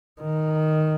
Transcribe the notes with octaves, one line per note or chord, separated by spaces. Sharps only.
D#3